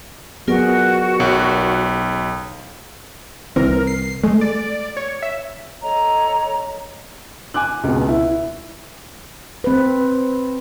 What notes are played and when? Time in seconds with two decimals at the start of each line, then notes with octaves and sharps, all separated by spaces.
0.48 F#3 B3 F4 F#4 G#4 A#4 D5
1.20 B1 C#5
3.56 C2 E3 C4 A#4
3.87 C7
4.24 G#3 A3
4.41 D5
4.97 C#5
5.22 E5
5.83 A4 C#5 D#5 A#5
7.54 G#5 D6 F#6
7.84 C#2 B2
8.08 E4
9.64 C4 B4